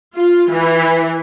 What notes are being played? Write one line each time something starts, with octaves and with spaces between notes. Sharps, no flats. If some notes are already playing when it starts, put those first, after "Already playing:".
F4
E3